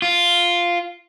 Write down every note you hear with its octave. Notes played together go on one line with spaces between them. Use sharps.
F4